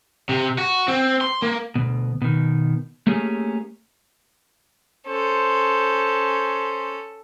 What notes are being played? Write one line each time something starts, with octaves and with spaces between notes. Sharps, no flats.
C3
F#4
C4
C6
A#3
D2 B2
B2 D#3
A3 A#3 C#4 G4 G#4
C#4 A4 C5